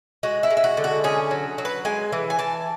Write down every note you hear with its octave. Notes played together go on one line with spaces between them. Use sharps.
G#3 F#4
E4
G#3
E4
F#4
D3
F#4
C#4 G#4
F#3
F#3
B4
G#3 G#5
E3
G#5
E3 A5